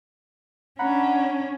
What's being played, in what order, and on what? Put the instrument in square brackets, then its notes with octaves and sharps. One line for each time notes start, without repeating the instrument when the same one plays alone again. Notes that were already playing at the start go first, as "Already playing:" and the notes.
[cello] C#4 D4 [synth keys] F#5 A#5 B5